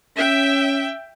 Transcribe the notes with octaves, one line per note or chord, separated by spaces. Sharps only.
C#4 E5 G5